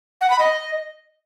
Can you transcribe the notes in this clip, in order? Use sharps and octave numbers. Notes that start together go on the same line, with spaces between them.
F#5
B5
D#5